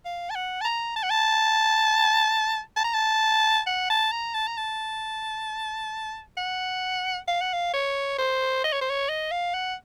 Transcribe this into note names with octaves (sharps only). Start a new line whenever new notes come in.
F5
A5
F#5
A5
A#5
A5
F#5
A5
A5
A#5
A5
F#5
A5
A#5
A5
A#5
A5
F#5
F5
F#5
F5
C#5
C5
D#5
C#5
C5
C#5
D#5
F5
F#5